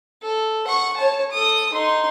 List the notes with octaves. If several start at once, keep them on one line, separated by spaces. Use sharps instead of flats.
A4
F#5 C#6
C#5 A5
A4 D#6
D#4 C6